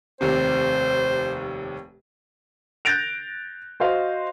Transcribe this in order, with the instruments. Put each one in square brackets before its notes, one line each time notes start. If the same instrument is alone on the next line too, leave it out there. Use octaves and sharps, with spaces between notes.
[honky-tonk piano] F1 D#2 C3 [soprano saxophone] C5
[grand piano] F#6 G6 A6 A#6 D7 F7
F#4 C5 D#5 F5